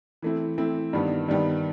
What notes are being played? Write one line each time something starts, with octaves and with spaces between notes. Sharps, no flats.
E3 A3 C4 E4
E3 A3 C4 E4
G2 D#3 G3 B3
G2 D#3 G3 B3